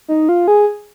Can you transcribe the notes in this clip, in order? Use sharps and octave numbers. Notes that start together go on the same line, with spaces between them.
D#4
F4
G#4